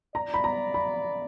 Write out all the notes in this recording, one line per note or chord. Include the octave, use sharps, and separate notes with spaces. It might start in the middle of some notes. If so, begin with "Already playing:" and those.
D5 A#5
B5
A#5
B5